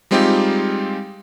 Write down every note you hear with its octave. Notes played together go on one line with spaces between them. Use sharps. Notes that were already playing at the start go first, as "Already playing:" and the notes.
G3 G#3 C4 D#4 F4 G4